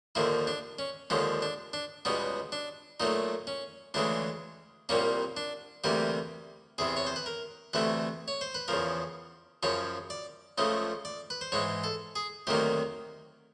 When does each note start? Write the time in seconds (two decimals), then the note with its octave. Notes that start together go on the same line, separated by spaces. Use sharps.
0.15 D#2 D3 F3 A#3 E4
0.47 D4
0.79 C#4
1.10 D#2 D3 F3 G#3 C#4
1.42 D4
1.73 D4
2.05 C#2 B2 G3 B3 C#4
2.52 D4
3.00 A#2 F#3 A3 D#4
3.47 C#4
3.94 D2 C#3 E3 G#3 D4
4.89 C2 A#2 G3 A#3 C#4
5.37 D4
5.84 D2 C3 E3 G3 A#3 G4
6.78 E2 C3 E3 G#4
6.97 C#5
7.07 C5
7.16 B4
7.26 A#4
7.73 D2 C3 E3 A3 B4
8.28 C#5
8.41 C5
8.55 B4
8.68 E2 C#3 F3 A#4
9.63 F#2 C#3 F3 C#5
10.10 D5
10.58 C#2 C#3 F3 A3 D#5
11.05 D5
11.30 B4
11.41 C5
11.52 G#2 E3 G#3 C#5
11.84 A4
12.16 G#4
12.47 D2 C3 D#3 F#3 A#3 G4